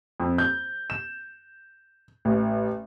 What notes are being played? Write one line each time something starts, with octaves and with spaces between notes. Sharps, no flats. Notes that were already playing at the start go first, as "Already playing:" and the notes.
F2
G6
E7
A1